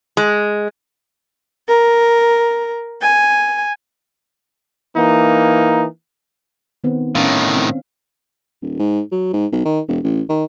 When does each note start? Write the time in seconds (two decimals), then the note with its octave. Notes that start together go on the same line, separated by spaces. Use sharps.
0.17 G#3
1.68 A#4
3.01 G#5
4.96 E3 A#3 D#4
6.84 D#3 B3 C4
7.15 A2 D#3 C#4 F5
7.55 C4
8.62 D#1
8.79 G#2
9.12 F#3
9.33 G#2
9.52 B1
9.65 D#3
9.88 E1
10.04 A1
10.29 D#3